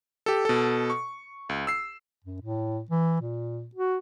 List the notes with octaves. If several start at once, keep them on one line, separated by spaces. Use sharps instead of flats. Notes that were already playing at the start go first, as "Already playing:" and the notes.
G4 A4
B2 A4
C#6
C#2
E6 C7
F#2
A2
E3
A#2
F#4